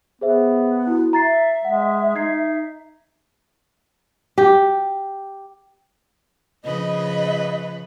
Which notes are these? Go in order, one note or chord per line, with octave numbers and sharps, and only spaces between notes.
B3 G#4 C5 E5
E4 F#4
E5 A#5 A6 C7
G#3 F#5
D#4 G#6 C7
G4
C#3 F3 B4 D#5